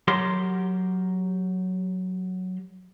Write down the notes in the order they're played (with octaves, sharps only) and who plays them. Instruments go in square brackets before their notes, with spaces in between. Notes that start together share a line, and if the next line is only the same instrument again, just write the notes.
[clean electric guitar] F#3 G4 A#4 C6